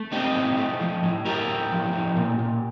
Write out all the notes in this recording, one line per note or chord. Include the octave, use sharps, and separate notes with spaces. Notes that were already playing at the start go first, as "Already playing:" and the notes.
Already playing: A3
C4 D#4 G4
A2
A3
F3
A2
A2 G4 A#4
A2
F3
A2
A#2
A#2